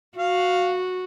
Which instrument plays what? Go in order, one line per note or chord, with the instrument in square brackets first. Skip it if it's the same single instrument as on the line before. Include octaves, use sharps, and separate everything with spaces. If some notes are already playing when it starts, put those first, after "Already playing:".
[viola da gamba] F#4 [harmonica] F5